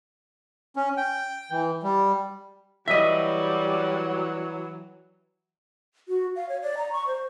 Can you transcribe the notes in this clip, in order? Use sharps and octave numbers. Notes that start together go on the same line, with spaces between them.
C#4
G5
E3
G3
E3 F#3 G3 D#5 E5
F#4
F5
C#5
D5
A#5
C#6
C5